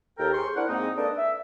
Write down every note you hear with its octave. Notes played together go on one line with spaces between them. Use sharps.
D#2 A4 A#4 G5
G#4 C5 C6 C#6
C4 D4 E4 A#4 F#5
G#2 G#3 A#3 C4 D#4
A#3 D4 A4 B4 D#5
E5